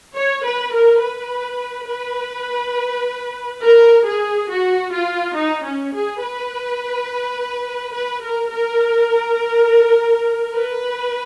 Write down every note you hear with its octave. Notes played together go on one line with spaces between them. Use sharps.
C#5
B4
A#4
B4
B4
A#4
G#4
F#4
F4
D#4
C#4
G#4
B4
B4
A#4
A#4
B4